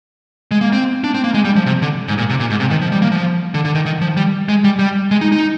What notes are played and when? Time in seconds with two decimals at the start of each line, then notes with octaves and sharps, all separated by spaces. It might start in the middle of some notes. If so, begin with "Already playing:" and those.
0.51 G#3
0.61 A#3
0.73 C4
1.04 D4
1.14 C4
1.24 A#3
1.34 G#3
1.45 G3
1.56 F3
1.66 C3
1.82 D3
2.08 G#2
2.18 A#2
2.29 C3
2.40 A#2
2.50 G#2
2.60 C3
2.70 D#3
2.82 F3
2.92 G3
3.02 A#3
3.12 F3
3.54 D3
3.65 D3
3.75 D#3
3.86 D#3
4.01 F3
4.17 G3
4.49 G#3
4.64 G3
4.79 G3
5.11 G#3
5.21 D#4
5.32 D#4